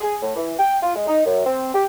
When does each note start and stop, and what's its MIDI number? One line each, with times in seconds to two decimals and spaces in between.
0.01 0.15 68
0.22 0.34 45
0.36 0.53 52
0.59 0.76 79
0.82 0.94 65
0.95 1.06 56
1.07 1.21 63
1.26 1.45 42
1.45 1.73 60
1.73 1.84 67